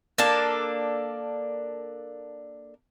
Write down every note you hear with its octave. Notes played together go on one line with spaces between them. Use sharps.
A#3 D4 A4